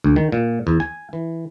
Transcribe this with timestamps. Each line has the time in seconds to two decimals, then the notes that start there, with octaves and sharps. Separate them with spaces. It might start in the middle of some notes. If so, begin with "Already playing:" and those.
0.04 D2
0.16 D#3
0.32 A#2
0.67 E2
0.80 G#5
1.13 E3